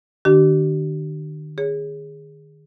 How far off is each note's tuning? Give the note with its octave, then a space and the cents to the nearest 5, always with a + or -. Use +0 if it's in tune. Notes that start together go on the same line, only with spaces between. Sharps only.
D#3 -35 D4 +0 G4 -40
G#4 -10 C#5 +10